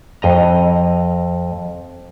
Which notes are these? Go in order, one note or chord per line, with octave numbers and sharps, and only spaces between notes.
F2 D#5 A#5